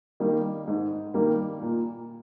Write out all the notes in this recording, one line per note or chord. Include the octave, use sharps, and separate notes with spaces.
D#3 G3 A#3
G#2
D#3 G3 A#3
A#2